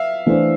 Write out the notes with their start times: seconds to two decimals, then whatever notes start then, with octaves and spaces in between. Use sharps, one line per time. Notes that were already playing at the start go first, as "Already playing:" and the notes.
Already playing: E5 F5
0.26 E3 A3 D4 A4 C5